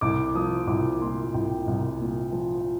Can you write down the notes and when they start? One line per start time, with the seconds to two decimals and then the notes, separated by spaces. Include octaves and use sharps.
0.01 C2 D6
0.35 F3 D#6
0.67 C2 D6
1.01 A#2 C6
1.34 C2 G5
1.67 C2
2.00 A#2
2.32 F3